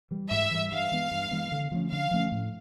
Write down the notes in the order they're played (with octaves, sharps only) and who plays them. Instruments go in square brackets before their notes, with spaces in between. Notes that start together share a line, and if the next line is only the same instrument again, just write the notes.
[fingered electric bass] E3 G3
[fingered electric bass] G#2 [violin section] E5
[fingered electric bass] E3 G3
[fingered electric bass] G2 [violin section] F5
[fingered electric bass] E3 G#3 B3
G2
E3 G#3 B3
D3
F3 A3 C#4
[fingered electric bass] D3 [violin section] F5
[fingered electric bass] F3 A3 C#4
A2